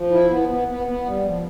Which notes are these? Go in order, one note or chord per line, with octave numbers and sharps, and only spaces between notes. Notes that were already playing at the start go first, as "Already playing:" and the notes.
Already playing: F3
E4
B3
B3
B3
B3
G3
F3